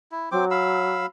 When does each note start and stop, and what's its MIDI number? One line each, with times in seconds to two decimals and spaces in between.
0.11 0.29 64
0.32 1.05 54
0.32 0.45 60
0.32 0.45 72
0.32 0.45 86
0.51 1.06 77
0.51 1.06 83
0.51 1.06 88